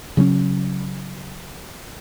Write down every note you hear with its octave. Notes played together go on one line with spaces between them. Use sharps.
C#3 F#3 C4 C#4